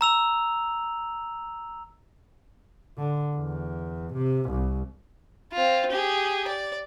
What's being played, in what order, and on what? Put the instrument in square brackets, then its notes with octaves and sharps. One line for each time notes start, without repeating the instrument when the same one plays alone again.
[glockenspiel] A#5 E6 F7
[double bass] D3
E2
C3
C2
[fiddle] C4 F4
G4 G#4
D5